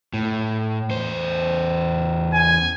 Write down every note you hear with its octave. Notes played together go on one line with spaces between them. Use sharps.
A2
E2 C5
G#5